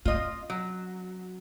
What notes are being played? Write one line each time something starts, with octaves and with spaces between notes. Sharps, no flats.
C4 C#4 F4 D#5
F#3